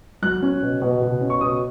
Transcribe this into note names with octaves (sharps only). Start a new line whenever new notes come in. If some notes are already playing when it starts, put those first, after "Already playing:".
F#3 F#6
C#4
B2
B2
B2
C#4
C#6
B2 D#6